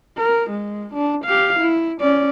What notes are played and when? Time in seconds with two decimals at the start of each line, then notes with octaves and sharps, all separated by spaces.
0.17 A#4
0.51 G#3
0.94 D4
1.25 G4 F5
1.60 E4
2.01 C#4 D5